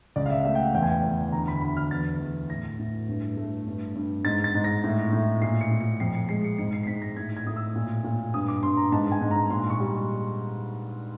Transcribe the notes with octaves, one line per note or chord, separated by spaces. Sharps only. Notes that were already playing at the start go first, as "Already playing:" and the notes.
C#2 D5
F5
E5
A3 E5
G5
F#5
E2 G5
G#5
G5
E2
D2 A#5
B5
D2 B5
F6
E2 A6
E2
A2 A#6
A2
G2
A3
G2
G2
G#2 A6
A6
G#2
A#6
A2
A2
A#2 C7
C#7
A#2
C#7
F2 C7
C#7
G#3 C7
C#7
G#2 C#7
C7
C7
G#2 B6
A#6
A2 G#6
G#6
A2 D#6
E6
A#2
A#2
G2 D#6
D6
G2 C6
A#5
G#2 A5
G#5
G#2
A#5
A#2 C6
C#6
G3